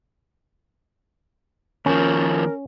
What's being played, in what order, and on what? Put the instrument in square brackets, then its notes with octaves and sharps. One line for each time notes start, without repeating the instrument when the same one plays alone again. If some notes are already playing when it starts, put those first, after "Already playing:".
[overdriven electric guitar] D#2 F3 [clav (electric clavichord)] C#4 [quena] A#4